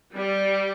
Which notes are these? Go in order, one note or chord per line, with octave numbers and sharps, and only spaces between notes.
G3